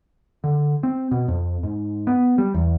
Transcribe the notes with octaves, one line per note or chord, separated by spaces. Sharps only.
D3
C4
B2
F2
G#2
B3
G3
E2